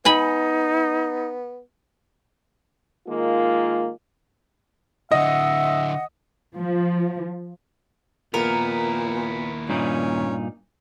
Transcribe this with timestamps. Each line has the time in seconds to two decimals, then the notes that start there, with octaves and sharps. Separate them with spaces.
0.05 B3 D#4 G#5 B5
3.08 D#3 G#3 A#3 F4
5.12 D3 E4 D#5 E5 F#5
6.57 F3
8.34 D#2 A#2 B3 E4 A#4
9.69 G2 A#2 C#4 D#4